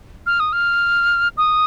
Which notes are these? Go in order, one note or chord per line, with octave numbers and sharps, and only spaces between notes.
F6
D#6
F6
D#6